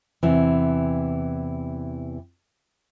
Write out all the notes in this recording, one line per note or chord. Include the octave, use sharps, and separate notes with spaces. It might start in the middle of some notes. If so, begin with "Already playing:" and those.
E2 C3 E3